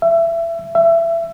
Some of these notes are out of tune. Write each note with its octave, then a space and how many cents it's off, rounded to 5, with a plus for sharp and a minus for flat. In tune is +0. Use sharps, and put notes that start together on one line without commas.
E5 +25
E5 +25